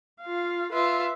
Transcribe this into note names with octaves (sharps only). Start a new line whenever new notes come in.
F4 F5
F4 B4 E5